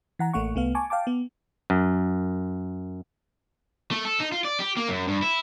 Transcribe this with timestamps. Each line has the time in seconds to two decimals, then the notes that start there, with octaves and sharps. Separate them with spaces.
0.19 E3 F#5 A#5
0.33 A1 A3 A#3 F#5 C#6
0.55 C2 A3 B3 F5
0.75 G#5 A5 C#6 D6
0.90 F5 G5 A5 D6
1.07 B3
1.70 F#2
3.91 A3
4.05 A4
4.20 D#4
4.32 F4
4.45 D5
4.60 G4
4.77 A#3
4.88 F#2
5.08 G2
5.22 E4